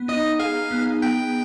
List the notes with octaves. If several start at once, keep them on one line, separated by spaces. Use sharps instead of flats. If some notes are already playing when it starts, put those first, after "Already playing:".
Already playing: B3
D#4 D#5
G#4 F5
B3
B3 G5